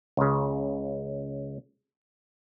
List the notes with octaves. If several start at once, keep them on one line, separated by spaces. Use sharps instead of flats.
C#2 C#3